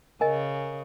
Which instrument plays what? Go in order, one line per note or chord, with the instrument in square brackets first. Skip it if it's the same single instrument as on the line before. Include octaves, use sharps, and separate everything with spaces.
[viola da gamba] C#3 [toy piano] A#4 D#5 G#5